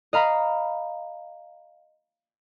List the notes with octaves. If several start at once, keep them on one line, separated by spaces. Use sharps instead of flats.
D#5 F5 A#5 B5